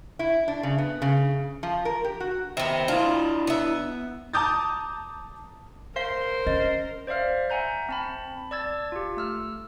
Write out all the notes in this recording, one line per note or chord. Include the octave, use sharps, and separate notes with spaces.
E4
D4
C#3
B3
C#3
F3
A#4
G4
F#4
D#3 B3 C5 E5
D4 E4 F4
B3 E5
A5 A#5 D6 D#6 G6 A6
A#4 C5 F5
C#4 D#5
C5 D5 E5 F5 F6
E5 F#5 G#5 A#5 G6
C4 A5 B5
D5 A5 E6 G#6 A6
F4 G4
A3 E6 F6